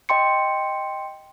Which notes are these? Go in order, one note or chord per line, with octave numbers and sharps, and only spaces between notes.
D#5 G5 C6 C#7